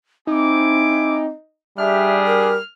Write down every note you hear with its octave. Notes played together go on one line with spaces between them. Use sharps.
C4 D#4 E4 G#5 D6
G3 D4 G4 G#4 E5 F6
A#4